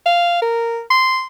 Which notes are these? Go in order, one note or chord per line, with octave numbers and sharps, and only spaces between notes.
F5
A#4
C6